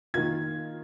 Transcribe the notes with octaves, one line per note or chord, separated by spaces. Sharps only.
D#3 A#3 F4 G#6